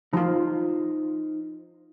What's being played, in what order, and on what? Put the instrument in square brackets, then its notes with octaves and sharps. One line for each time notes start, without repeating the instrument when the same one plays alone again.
[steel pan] F3 F4 [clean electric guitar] D#4 C5